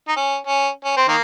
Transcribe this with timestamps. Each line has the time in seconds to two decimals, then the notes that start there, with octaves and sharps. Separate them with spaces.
0.08 D#4
0.16 C#4
0.47 C#4
0.85 C#4
0.97 C4
1.08 D#3 A#3